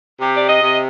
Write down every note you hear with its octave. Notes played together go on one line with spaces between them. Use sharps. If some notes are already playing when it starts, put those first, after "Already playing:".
C3 G4
D5
D#5
C3